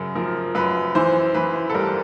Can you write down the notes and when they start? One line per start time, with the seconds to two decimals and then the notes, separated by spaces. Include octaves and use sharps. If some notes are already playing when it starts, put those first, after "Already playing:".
Already playing: F#2 C#3 A#4
0.15 F3 A#4
0.55 F#2 B4
0.95 E3 C5
1.35 E3 B4
1.70 A4
1.74 G3 A#4